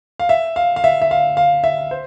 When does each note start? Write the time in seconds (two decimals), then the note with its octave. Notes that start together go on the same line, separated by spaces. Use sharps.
0.20 F5
0.29 E5
0.56 F5
0.76 F5
0.84 E5
1.02 E5
1.11 F5
1.37 F5
1.64 E5
1.91 C5